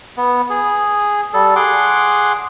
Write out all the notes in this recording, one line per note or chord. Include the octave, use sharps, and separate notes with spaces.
B3
G#4
G3 A4
G#4 F#5 C6 D6